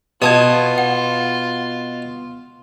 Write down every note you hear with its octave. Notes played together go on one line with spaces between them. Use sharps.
B2 F4 D#5 A5 D#6 G#6
F#5